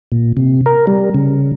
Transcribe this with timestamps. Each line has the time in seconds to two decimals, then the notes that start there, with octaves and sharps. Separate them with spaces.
0.12 A#2
0.37 C3
0.66 A#4
0.87 G3
1.14 C#3